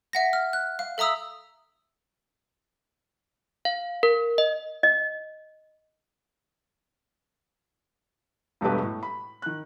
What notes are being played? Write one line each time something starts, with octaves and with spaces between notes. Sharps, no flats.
E5 F#5 A#6
F6
F#6
F5
A4 E5 A#5 D#6 E6
F5
A#4
D#5
D#5
E1 G2 B2 A3 G4 B4
A2
B5
D#3 F#6